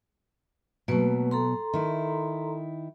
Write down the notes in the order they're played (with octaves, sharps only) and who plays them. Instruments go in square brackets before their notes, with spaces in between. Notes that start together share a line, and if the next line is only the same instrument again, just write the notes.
[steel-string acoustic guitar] B2 F#3 [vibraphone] A3 A#3 B4
[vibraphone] A4 A#5 C6
[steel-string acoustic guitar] D#3 E4